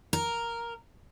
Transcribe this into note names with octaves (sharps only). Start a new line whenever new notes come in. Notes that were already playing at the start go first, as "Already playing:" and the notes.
A#4